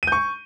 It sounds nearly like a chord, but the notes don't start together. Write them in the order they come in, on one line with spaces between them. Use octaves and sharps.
D#7 G6 C#6